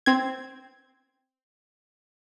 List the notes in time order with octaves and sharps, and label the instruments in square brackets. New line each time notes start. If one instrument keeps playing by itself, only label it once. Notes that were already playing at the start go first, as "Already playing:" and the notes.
[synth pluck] C4 G#6